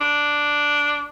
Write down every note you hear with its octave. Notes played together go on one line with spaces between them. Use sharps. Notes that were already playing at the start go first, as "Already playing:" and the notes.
D4